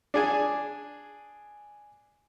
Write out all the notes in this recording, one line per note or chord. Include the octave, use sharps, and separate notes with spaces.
D4 G#4 G#5